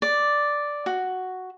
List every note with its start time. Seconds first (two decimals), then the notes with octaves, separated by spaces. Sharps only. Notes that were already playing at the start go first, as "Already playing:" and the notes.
0.02 D5
0.86 F#4